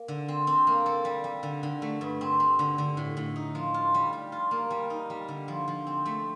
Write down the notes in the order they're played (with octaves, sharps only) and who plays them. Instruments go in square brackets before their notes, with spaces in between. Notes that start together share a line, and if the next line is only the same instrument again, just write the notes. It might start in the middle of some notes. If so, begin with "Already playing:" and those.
Already playing: [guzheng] A#3
D3
C4
C4
A#3
A4
G3
G3
D3
D3
A3
G2
C4
C4
D3
D3
A2
A2
D#4
F3
F4
G3
G3
F4
A#3
G3
D#4
G3
D3
F3
F3
C4
A3